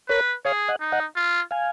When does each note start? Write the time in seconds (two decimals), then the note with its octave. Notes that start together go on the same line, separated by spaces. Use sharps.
0.09 A#4 B4 C#5
0.45 G#4 C#5 F5
0.68 D#5 F#5
0.80 D#4
0.92 D#5 F#5
1.16 F4
1.51 F5 G#5